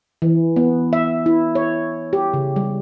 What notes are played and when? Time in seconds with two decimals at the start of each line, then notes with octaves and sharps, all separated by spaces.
0.22 E3
0.56 B3
0.93 E5
1.26 E4
1.55 C#5
2.13 G4
2.34 C#3
2.56 G3